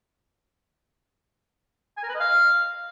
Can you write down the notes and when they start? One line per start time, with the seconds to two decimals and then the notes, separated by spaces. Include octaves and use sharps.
1.97 G#5
2.03 A#4
2.09 B4
2.14 D#5
2.20 F5